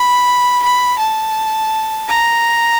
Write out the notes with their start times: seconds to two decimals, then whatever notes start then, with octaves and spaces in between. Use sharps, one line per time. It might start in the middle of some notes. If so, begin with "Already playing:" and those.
Already playing: B5
0.63 B5
0.99 A5
2.08 A#5